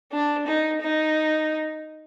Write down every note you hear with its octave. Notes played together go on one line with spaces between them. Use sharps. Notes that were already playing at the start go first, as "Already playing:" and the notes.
D4
D#4
D#4